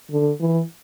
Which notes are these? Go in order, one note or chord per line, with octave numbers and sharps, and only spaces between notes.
D3
E3